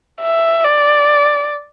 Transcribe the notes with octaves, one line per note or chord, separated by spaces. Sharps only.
E5
D5